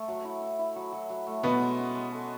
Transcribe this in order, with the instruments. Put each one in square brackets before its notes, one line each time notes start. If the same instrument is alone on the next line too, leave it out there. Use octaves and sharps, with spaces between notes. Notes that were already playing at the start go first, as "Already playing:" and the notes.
Already playing: [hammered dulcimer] A3
F#3
E4
E4
E4
F#3
F#3
F#3
A3
[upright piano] B2 B3 [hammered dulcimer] F#4
[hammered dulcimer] G#3
C#4
G#3
A4